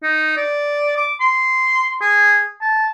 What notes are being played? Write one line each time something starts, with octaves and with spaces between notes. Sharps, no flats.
D#4
D5
D6
C6
G#4
A5